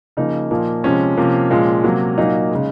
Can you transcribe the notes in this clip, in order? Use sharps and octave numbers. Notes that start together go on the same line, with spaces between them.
C#3 F3 A#3 D#4
A#2 F3 A#3
C3 F3 G#3 C#4
C3 F3 A#3
A#2 F3 G#3
C3 F#3 A#3
A#2 F#3 A#3 D#4
C#3 G#3